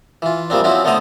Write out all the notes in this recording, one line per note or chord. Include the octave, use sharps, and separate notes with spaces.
E3 F4
F3 G3 A#3 C4 D4
F3 C4 C#4 E4 F#4
D3 A3 B3 C5 A#5 D#6